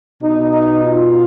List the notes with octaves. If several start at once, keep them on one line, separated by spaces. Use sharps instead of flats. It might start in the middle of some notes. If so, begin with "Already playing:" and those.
B2 D#4
D#4
F4